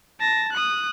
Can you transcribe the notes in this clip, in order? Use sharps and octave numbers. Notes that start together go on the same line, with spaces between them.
A5 A#6
D#6 F#6